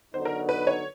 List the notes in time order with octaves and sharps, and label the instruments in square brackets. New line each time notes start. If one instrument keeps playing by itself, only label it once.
[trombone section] D3 F#3 B3 D#4 [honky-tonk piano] C5
[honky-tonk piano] A#4
B4
C#5